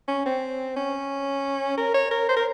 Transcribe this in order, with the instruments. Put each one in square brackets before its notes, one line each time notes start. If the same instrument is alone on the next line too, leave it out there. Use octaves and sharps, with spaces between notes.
[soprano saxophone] C#4
C4
C#4
A#4
C#5
A#4
C5
A#4